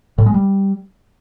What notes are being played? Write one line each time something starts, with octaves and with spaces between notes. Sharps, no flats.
A2
G#3
G3